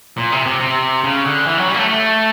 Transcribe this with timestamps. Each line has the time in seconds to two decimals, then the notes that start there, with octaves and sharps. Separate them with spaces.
0.18 A#2
0.32 C3
0.46 C3
0.61 C3
1.04 C#3
1.25 D3
1.46 E3
1.58 F#3
1.68 G3
1.74 A#3
1.79 A3
1.89 A3